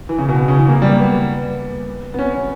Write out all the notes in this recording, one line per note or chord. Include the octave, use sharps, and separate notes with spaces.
E3
C#3
B2
C#3
E3
A#3
G3
A#3
B3
B3
C#4
C#4